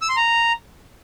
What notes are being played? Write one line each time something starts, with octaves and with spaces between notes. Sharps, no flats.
E6
C6
A#5